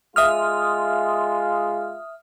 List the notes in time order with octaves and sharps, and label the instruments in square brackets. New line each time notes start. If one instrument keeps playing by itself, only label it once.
[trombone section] G#3 F4 [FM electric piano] E5 D#6 F6